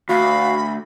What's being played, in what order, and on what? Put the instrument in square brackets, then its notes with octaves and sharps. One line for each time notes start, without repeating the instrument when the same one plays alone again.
[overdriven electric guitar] D2 [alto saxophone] F#4 [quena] F5 [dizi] B5